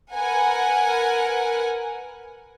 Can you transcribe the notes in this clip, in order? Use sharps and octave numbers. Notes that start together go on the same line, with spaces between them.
A#4 B4 F#5 G#5